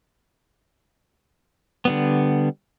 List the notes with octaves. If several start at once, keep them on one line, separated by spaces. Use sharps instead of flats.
D3 G3 B3